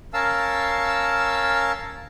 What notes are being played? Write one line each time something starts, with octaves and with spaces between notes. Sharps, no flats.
C#4 A#4 F5 A5 E6